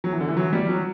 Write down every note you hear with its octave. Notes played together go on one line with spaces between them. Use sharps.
F#3
E3
D3
E3
F#3
G3
F#3